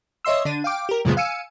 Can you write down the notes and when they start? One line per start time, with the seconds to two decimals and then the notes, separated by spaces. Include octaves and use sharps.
0.25 C#5 D#5 E5 C6 E6
0.45 D3 D4 D#7
0.64 F5 G5 D6
0.89 G4 A#4
1.05 F#2 A#2 C#3 F3 G#3 B3
1.17 F5 G#5 E6 C#7 D#7